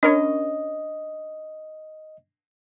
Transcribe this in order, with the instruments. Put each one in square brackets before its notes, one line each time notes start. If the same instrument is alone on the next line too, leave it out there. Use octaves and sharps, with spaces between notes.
[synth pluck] C#4 A#4 C#5 [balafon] D4 [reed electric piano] D#5